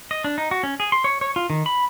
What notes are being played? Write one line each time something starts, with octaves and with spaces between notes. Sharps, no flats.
D#5
D4
D#4
F#4
C#4
G#4
C6
C#5
C#5
F4
D#3
B5